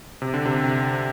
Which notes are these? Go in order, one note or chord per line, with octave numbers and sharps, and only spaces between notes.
C3
D3
C3
C3